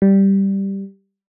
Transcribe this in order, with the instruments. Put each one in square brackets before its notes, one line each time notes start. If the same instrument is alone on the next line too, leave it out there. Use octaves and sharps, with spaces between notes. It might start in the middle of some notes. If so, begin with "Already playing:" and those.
[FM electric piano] G3